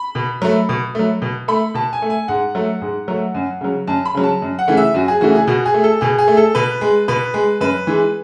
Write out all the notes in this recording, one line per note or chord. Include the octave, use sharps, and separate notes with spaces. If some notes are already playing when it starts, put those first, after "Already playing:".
Already playing: B5
B2
F#3 A3
B2
F#3 A3
B2
A3 B5
B2 A5
G#5
A3
G#5
G#2 F#5
F#3 A3
G#2
F#3 A3
F#2
C#3 F#3
F#2 A5
B5
C#3 F#3
A5
F#2
F#5
C#3 E3 A3
E5
F#2 F#4
G#4
C#3 E3 A3 F#4
G#4
B2 F#4
G#4
A3
A4
B2 G#4
G#4
A3
A4
B2 B4
G#3
B2 B4
G#3
F#2 B4
E3 G#3